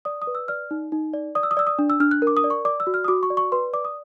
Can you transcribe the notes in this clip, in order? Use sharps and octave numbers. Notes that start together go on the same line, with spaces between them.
D5 D#6
D#6
B4
E6
D5 F6
D#4
D#4
D5
D5 D#6
E6
D#6
D5 E6
D#6
D4
E6
D4 F6
F#6
A#4
D6
D#6
D5
C#6
D5 D6
E6
F#4
F6
D#6
F#4 D6
C#6
D5
C#6
B4 C6
D5 D6
D#6